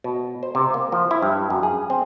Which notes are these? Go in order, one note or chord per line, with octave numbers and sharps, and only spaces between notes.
B2
C5
C3
A#3
F3
E4
G2
F#2
G#4
C4